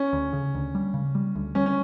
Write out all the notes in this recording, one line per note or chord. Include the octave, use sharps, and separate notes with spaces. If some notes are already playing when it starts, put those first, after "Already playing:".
Already playing: C#4
D2
C#3
D2
G3
C#3
G3
D2
G3 C#4
C#4